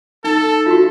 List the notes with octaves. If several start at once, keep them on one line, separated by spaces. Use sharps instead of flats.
D#4 A4
F4
F#4